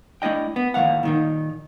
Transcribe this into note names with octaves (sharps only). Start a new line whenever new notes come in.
A3 D4 E4 D#5 G5
B3
D#2 A2 F#3 F5 F#5
A#2 D#3 D#4